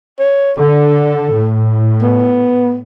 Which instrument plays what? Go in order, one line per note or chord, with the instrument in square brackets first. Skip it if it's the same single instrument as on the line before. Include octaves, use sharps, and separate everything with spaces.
[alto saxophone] C#5
[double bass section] D3 [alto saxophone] A4
[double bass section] A2
[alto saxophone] B3